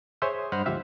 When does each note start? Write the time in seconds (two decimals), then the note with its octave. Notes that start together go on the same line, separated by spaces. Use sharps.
0.22 G#4 C5 C#5 E5 C6 D#6
0.52 G2 C5 D#5 F#5 B5 F6
0.66 D2 G#2 F3 G4 E5 F5